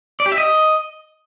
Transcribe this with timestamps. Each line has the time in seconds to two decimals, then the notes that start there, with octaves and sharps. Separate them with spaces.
0.20 D5
0.26 G4
0.32 E5
0.38 D#5